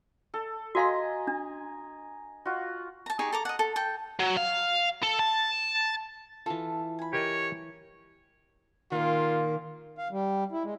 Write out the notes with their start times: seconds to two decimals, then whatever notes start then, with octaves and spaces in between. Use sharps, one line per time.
0.34 A4
0.75 F#4 D#5 F5 G#5 A#5 C6
1.27 D4
2.45 F4 F#4
3.06 A5 A#5
3.19 D#4 G4 G#4 C#6
3.32 A4 A#5 D6
3.45 D#5 F#5
3.59 A4
3.76 A4 G5
4.20 F#3
4.37 F5
5.03 A4
5.19 A5
6.46 E3 F4 A4
6.99 G#5 B5
7.13 G4 A#4 C#5 D#5
8.92 A#2 D#3 A#3 F4
9.98 F5
10.11 G3
10.52 E4
10.63 G#3